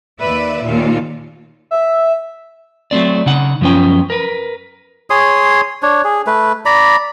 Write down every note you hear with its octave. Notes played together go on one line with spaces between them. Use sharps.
D#2 B4 D5 E5
D#2 A#2 F4
E5
F#3 A3 C4 D5
C#3 D#4 F#5
F#2 F3 B3 C#4 G5
A#4 B4
G#4 C#5 C6 D#6
D4 C#5
G#4
A3 B4
D5 A#5 B5